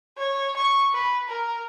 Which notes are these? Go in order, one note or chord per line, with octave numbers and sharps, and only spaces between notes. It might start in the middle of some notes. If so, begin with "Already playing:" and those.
C#5
C#6
B4
A#4